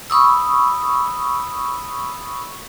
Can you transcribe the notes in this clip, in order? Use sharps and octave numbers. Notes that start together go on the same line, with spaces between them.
B5 C#6 D#6 E6